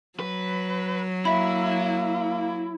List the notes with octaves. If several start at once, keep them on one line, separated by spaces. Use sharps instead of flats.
F#3 B4
A#3 E4 E5 B5